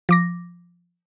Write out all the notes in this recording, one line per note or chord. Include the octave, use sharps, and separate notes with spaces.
F3 D6 A#6